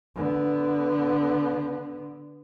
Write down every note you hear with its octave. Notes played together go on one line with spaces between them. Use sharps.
D3 B3